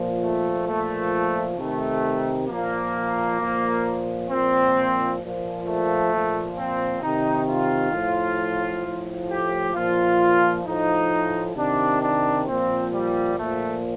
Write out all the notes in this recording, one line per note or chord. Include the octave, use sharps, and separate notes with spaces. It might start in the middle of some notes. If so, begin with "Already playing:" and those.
Already playing: A#2 F3
A3
A#2 F3 A3
C3 D#3 A3
A#2 F3 A#3
A#2 F3
A#2 F3 C4
A#2 F3
A3
A#2 F3
C4
C3 D#3 D#4
F4
A2 F3
A2 F3
G4
A#2 F3 F4
A2 F3 D#4
C3 D#3 D4
D4
A#2 F3 C4
G3
A#2 F3 A3